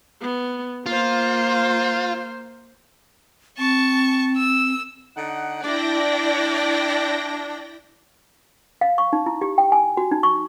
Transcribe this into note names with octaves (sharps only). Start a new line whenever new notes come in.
B3
A#3 F4 C5
C4 A5 C#6
E6
D3 D#4 F#5
D4 E4 D5 G5 A#6
F5
C#6
D#4
E4
G4
G5
G#5
F#4
D#4
C#6